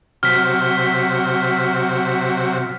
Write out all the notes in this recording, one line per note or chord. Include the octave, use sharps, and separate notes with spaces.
C3 F#3 F6 B6